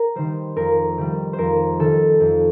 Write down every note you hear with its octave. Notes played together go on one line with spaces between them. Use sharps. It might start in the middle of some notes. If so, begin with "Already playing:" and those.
Already playing: A#4
D#3 G3 C5
F2 A#4
D#3 G3
C5
F2 A#4
D#3 G3 A4
F2